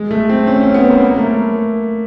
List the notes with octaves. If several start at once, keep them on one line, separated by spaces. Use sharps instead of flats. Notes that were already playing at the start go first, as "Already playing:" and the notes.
Already playing: G#3
A3
C4
C#4
C#4
B3
A#3
A#3
A3